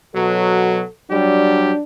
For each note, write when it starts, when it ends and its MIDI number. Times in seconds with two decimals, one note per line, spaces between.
0.15 0.82 47
0.15 0.82 54
0.15 0.89 69
1.11 1.73 54
1.11 1.73 55
1.11 1.83 62
1.11 1.73 67